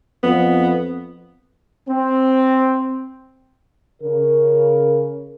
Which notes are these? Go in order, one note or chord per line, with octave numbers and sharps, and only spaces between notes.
F2 B3
C4
C#3 A#4